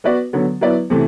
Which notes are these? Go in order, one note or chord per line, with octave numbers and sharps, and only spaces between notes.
B3 F#4 B4 D5
D3 F#3 B3
F#3 B3 E4 B4 D5
C3 E3 A3